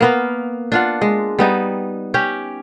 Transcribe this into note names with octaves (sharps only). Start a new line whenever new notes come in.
A#3 B3 A#4
D4 F4 F#5
G#3
G3 B3 D#4
C#4 G4